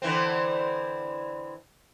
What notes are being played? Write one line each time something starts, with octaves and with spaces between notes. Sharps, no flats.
D3 E3 C4